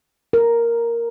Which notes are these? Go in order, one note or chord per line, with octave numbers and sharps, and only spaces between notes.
A#4